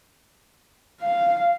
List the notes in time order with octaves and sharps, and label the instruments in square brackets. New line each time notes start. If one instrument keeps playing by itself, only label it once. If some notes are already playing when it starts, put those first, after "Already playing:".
[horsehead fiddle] F5